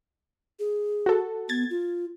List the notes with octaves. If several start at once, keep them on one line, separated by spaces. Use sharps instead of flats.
G#4
F#4 A4
B3 G#6 A6
F4